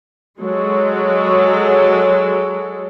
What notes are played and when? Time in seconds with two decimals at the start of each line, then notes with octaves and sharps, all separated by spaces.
0.39 F#3 G#3 A4